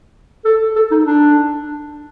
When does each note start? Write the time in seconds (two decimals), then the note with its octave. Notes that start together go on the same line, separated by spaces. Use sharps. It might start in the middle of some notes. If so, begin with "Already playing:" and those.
0.45 A4
0.76 A4
0.91 D#4
1.06 D4